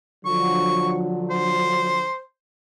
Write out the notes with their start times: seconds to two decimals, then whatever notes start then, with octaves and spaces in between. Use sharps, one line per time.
0.26 D3 F3 F#3 C#6
1.30 C5